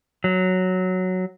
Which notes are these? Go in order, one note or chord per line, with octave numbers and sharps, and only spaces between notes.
F#3